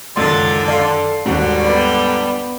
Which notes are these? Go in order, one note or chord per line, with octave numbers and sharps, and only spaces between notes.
C#2 F#2 D3 D#3 C6 A6
A4 D5 F5 C6
D#2 G#2 D3 G3 F#4
B3 D5